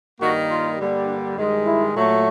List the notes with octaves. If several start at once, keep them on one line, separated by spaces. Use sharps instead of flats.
G2 D#3 G3 A#3 F#4
F4
G2 D3 G3 A#3
D4
G2 D#3 G#3
E4
A#2 F#3 A3